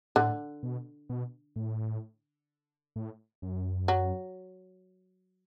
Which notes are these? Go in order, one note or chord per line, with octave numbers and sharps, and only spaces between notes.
A2 D3
B2
B2
A2
A2
F#2
F#3